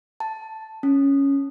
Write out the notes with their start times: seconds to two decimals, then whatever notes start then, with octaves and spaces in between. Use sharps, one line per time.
0.20 A5
0.83 C#4